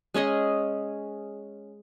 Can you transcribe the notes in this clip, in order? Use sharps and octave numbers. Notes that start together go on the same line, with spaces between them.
G#3 C#4 G#4 D#5